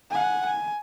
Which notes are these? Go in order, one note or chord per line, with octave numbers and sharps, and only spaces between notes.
F#5 G#5
G#5